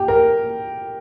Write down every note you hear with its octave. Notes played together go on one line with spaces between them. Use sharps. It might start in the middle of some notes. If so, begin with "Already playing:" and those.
Already playing: G4
A#4